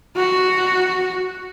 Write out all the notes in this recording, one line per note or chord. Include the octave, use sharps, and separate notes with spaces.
F#4